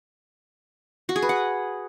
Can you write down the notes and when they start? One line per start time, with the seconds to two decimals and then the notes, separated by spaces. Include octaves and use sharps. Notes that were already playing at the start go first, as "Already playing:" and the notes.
1.09 F#4
1.16 G#4
1.22 B4
1.29 F#5